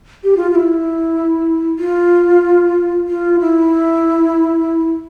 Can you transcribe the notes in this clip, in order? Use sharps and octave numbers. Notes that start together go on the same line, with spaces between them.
G4
F4
F4
E4
F4
F4
E4